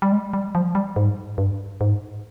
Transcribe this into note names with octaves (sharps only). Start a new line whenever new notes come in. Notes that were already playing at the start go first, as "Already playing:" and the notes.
G3
G#3
G3
F3
G3
G#2
G2
G#2